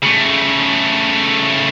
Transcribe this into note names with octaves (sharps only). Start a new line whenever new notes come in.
C#3 A3